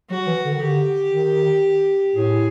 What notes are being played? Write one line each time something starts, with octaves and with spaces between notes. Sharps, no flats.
F#3 F#4
E3
D3
D#3
D3 G4
D#3
A2 G#4